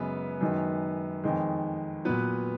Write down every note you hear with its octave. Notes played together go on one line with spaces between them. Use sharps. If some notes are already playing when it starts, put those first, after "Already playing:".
Already playing: F#2 C#3 G#3 B3 B4
F#2 D#3 G#3
F2 D#3 G#3
A#2 F#3 B3 B4